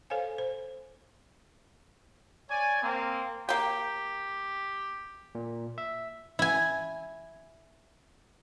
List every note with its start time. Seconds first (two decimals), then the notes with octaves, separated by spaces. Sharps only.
0.10 A4 C5 C#5 F5 G#5
0.38 C5
2.50 C#5 D5 G#5
2.82 A#3 C4
3.49 A#3 G4 G5
5.35 A#2
5.78 E5
6.39 E4 G#5